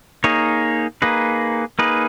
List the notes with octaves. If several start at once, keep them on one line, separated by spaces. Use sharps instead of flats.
A#3 D#4 G#4 C#5
A#3 D#4 G#4 B4
A#3 D#4 G#4 B4